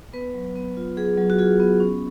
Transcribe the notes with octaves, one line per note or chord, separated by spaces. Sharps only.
B3 B4
F#3
B3
F4
F#3 G#4
F#3
F#4
F4 G#4
B3
C#4